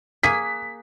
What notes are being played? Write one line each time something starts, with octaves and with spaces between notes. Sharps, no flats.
A#3 G#4 B6